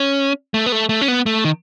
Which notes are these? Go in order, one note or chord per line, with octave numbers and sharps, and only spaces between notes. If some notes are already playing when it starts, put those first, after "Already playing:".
Already playing: C#4
A3
B3
A3
A3
C#4
B3
A3
D#3